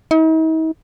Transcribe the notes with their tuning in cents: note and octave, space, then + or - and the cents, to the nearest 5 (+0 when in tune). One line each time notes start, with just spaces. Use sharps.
D#4 +45